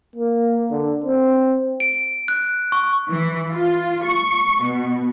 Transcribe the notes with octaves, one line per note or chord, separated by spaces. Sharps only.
A#3
D3
C4
D7
F#6
C#6
E3
F4
C#6
B2